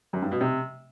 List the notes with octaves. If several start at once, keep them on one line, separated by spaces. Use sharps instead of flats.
F#2
G2
B2
C3